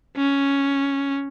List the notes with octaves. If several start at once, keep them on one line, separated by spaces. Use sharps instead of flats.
C#4